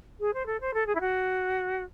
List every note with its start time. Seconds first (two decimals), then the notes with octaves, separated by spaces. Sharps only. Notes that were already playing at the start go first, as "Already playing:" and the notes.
0.20 G#4
0.33 C5
0.46 A4
0.60 C5
0.73 A4
0.86 G#4
0.95 E4
1.00 F#4